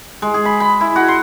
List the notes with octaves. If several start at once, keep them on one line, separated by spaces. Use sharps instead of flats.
G#3
G#4
B5
B5
E4
F#4
C6